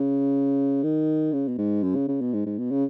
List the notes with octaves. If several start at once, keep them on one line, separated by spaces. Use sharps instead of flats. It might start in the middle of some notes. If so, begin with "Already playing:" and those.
Already playing: C#3
D#3
C#3
B2
G#2
F#2
C#3
C#3
B2
G#2
G#2
B2
C#3